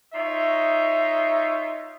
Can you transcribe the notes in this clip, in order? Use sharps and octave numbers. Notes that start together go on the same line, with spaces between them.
D#4 F4 C#5 E5